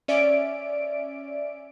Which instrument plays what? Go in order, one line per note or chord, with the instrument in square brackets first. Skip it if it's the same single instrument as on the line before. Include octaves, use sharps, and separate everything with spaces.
[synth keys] C#4 D5 E5 D7